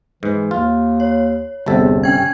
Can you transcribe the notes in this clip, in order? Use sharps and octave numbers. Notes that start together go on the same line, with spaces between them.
G#2 E3
D#2 F4
C#5
G1 E2 C3 A4
C#4 G5 G#6